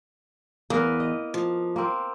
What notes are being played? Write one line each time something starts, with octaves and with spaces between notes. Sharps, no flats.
E2 A#3 A#4 B4
D#5
F3
A#3 C4